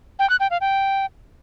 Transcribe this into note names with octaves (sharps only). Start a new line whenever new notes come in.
G5
F#6
G5
F5
G5